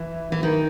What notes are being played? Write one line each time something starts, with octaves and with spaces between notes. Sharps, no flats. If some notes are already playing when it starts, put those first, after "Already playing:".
Already playing: E3
E3
D#3